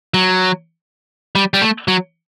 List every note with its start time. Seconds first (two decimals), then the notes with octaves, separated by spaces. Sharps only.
0.14 F#3
1.35 G3
1.54 G3
1.62 A3
1.88 F#3